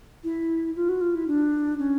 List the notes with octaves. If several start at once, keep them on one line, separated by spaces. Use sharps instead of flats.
E4
F4
F#4
F4
E4
D4
C#4